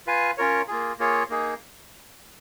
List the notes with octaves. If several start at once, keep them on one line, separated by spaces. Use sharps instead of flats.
F4 B4 F5 G#5
C#4 F4 A#4 C#5
A#3 F4 G#4
A#3 F4 G#4 C#5
A#3 D#4 G#4